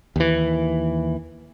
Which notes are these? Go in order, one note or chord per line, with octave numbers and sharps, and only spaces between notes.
D#2 E3